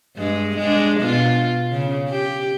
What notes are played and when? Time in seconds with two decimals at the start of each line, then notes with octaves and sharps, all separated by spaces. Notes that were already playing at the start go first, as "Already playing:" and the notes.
0.16 G2 G#3
0.57 G#3 D4
1.00 B2 F4
1.72 C#3
2.09 G4